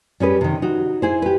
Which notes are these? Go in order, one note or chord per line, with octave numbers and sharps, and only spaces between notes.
G3 C#4 G#4 B4
C3 D#3
D#4 F#4
E4 G#4 C5
G4 B4